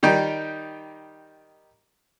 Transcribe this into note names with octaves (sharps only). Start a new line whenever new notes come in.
D#3 G3 D#4 G4